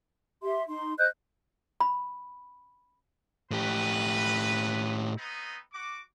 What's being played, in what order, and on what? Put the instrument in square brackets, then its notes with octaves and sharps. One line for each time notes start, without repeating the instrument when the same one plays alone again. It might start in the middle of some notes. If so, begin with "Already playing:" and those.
[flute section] G4 E5 C6
D#4 C6
C5 D#5 F#6 G6
[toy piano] B5
[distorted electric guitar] A2 G4 [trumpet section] B4
[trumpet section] B3 C4 D#4
F#4 D6